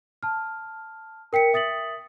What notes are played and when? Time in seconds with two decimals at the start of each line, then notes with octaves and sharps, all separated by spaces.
0.23 A5 F6
1.33 A#4 G5 B6 C#7
1.53 E5 D#6 A6 B6 F#7